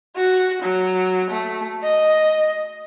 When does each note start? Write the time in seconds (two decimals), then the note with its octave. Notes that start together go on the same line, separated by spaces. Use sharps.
0.16 F#4
0.63 F#3
1.31 A3
1.83 D#5